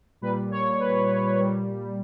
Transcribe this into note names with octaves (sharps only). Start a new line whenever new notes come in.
A#2 G3 B4
C#5
B4
A#2 G3